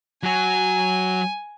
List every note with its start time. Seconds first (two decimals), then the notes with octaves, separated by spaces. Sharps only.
0.23 F#3 F#4 G#5